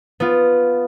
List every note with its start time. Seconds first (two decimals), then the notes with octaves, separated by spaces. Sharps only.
0.20 B3 F4